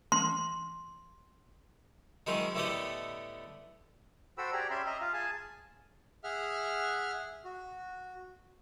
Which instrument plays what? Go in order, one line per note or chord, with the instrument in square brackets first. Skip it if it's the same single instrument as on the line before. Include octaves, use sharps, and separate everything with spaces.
[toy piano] C6
[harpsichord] D#3 F#3 G#3 C4 C#4 E4
A2 D3 A3 B3 G4 D#5
[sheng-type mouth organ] F#4 A4 C5 G5 B5 E6
G4 G#4 D5 A#5
C#4 G4 E5 B5 C6
D#5 E5 A#5
F4 F5
G#4 G#5 A5
G#4 E5 F#5 F6
F#4